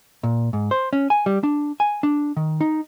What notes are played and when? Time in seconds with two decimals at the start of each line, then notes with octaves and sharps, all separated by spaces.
0.23 A#2
0.53 G#2
0.71 C5
0.93 C#4
1.10 G#5
1.26 G3
1.43 D4
1.80 G#5
2.03 D4
2.37 D#3
2.61 D#4